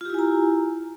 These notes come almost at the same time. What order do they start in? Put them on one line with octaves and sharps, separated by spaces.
F4 G4 E4 G#5 A#5